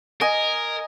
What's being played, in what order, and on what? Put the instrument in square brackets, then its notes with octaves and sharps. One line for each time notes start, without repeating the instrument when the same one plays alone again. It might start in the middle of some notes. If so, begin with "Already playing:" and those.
[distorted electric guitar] A#4 [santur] D#5 G#5